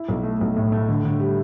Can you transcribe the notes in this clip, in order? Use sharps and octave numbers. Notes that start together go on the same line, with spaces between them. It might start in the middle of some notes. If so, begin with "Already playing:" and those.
Already playing: E4
B1
A3
B1
A2
A3
D3
D3
G3